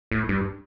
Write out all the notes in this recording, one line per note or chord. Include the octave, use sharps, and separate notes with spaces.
A2
G2